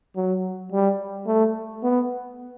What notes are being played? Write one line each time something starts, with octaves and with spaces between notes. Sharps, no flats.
F#3
G3
A3
B3